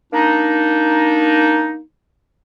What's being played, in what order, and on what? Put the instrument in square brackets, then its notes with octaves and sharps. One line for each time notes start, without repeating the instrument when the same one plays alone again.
[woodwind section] A#3 D4 D#4